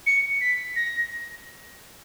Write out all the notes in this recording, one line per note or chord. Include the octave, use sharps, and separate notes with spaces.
C#7
B6
A#6